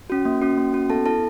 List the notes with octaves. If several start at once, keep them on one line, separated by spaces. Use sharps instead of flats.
C#4 F#4
A#3
C#4 F#4
A#3
C#4 F#4
B3 A4 A5
E4 A4 A5